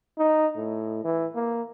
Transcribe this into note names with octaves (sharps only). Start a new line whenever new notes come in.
D#4
A2
E3
A#3